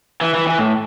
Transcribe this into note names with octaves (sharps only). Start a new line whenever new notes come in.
E3
E3
E3
A2